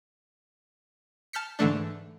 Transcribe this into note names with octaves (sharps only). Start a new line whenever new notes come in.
A5 F6 G6 B6 C#7
G#2 D3 E3 A3 D4